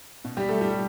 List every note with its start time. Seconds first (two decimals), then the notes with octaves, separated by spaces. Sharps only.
0.25 B2
0.37 G3 G4
0.49 A3 A4
0.61 G3 G4